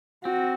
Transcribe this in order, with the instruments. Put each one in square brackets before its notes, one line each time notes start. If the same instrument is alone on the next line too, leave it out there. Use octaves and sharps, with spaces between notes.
[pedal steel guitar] C4 [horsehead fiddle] F#4